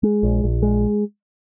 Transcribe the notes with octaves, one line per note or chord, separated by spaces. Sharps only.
G#3
A#1
A#1
G#3